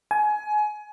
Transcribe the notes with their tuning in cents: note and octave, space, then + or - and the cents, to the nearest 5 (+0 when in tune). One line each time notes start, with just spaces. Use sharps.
G#5 +25